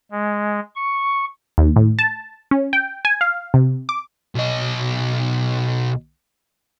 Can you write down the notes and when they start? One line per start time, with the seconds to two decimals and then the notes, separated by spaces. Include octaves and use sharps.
0.11 G#3
0.75 C#6
1.58 D#2
1.76 A2
1.99 A5
2.51 C#4
2.73 G5
3.05 G#5
3.21 F5
3.54 C3
3.89 D6
4.35 B1 D#5